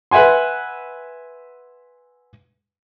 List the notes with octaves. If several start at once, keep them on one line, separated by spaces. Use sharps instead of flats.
B4 E5 F#5 G#5 C6